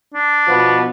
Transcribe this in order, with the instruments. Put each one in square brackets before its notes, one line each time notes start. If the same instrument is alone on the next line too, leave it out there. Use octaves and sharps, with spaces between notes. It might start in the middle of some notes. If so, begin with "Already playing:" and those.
[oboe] D4
[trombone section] B2 F3 B3